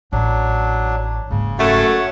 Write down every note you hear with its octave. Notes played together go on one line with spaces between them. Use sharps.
A1 F#3 D4
F#1 G#2 C#3
F#2 A3 C#5 F#5